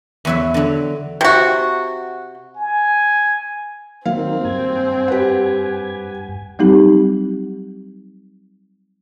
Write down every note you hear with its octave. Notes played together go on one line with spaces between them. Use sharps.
E2 F#3 E5
D3 F#3
C3 F#4
G#5
D#3 F#3 A#3 C4 F5
G2 G#5
G4 B4 F#5
F#3 G3 C4 D#4 G4